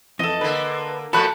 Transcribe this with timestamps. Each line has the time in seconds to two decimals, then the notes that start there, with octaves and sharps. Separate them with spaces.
0.19 F2 E3 A4 D#5
0.41 D3 A#3 B4
1.13 A#2 F3 A3 F#4 A4 B5 F#6